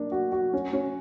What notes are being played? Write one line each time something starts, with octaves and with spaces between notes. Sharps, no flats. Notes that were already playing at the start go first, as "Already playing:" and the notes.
Already playing: A#3 D4
F#4
F#4
C#4
C#4